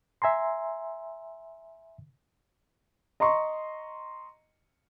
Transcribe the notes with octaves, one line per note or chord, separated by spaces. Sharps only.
E5 G#5 A#5 C6
D#5 A#5 C6 C#6